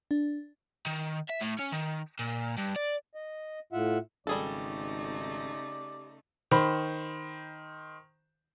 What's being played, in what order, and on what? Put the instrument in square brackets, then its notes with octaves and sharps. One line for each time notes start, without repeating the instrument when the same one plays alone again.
[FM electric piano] D4
[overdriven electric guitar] D#3
E5
A2
C#4
D#3
A#2
G2
D5
[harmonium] D#5
A2 F4 E5 F#5
[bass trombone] G#1 [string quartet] C#3 A3 D#4 [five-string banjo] G3 G#4 A4 [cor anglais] D5
[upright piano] D#3 C5 B5